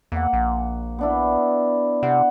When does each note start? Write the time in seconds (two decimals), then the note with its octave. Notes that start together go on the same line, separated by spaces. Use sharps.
0.12 E2 A#3 F#5
0.33 A#1
0.99 B3 D4 E4
2.03 C3 F#5